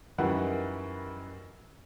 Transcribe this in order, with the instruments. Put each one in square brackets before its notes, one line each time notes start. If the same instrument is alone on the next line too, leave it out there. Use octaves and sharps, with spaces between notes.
[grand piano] F#2 D#3 E3 G3 B4 F#5